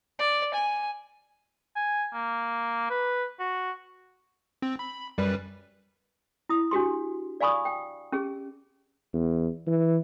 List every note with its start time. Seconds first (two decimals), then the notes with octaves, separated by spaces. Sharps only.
0.19 D5
0.54 G#5
1.76 G#5
2.13 A#3
2.90 B4
3.39 F#4
4.62 C4
4.79 B5
5.18 F#2 G3 B4
6.49 E4 D#6
6.71 D4 F#4 G4 C6
7.41 D5 F5 G#5 B5 C#6 D#6
7.65 G5
8.12 C#4 G4 G#4
9.13 E2
9.67 E3